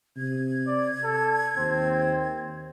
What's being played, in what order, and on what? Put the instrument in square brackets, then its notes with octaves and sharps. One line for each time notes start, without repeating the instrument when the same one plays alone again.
[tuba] C3 [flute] G#6
[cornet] D5
A4
[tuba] D#2 [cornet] C4